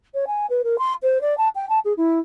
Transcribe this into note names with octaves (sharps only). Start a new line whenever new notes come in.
C#5
G#5
B4
A#4
C6
C5
D5
A5
G5
A5
G#4
E4